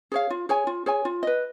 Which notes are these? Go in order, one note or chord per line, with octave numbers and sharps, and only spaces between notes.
G#4 C#5 F5
F4
G#4 C#5 G#5
F4
G#4 C#5 G#5
F4
B4 D#5